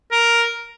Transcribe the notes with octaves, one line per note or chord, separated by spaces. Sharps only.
A#4